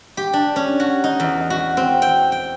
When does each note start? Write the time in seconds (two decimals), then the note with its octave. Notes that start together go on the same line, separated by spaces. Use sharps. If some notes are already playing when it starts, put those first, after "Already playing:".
0.17 G4
0.33 D4
0.56 C#4
0.80 F#4
1.04 D#4
1.20 E2
1.50 F#4
1.77 C4
2.02 G5
2.32 G5